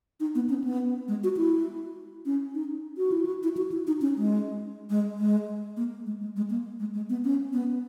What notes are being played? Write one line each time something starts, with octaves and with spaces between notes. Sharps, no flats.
D#4
B3
C#4
B3
G#3
F#4
E4
C#4
D#4
F#4
E4
F#4
E4
F#4
E4
D#4
C#4
G#3
G#3
G#3
A#3
G#3
G#3
G#3
A#3
G#3
G#3
B3
C#4
B3